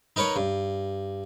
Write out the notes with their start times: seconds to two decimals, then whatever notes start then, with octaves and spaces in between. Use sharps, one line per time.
0.16 D#4 A#4 B4 C#5
0.36 G2